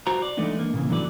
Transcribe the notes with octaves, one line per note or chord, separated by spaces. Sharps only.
F#4 C5 A#5
D5
E3 G#3 A3 B3 D4 D#4
A#3
A#2 C#3 E3
F#2 A2 D3 E3 F#3 D5